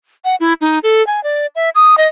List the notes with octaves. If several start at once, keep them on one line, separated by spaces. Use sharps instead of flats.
F#5
E4
D#4
A4
G#5
D5
E5
D#6
D#5